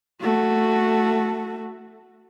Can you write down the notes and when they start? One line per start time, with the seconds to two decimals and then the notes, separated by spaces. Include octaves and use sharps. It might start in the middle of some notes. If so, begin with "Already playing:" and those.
0.21 A3 F#4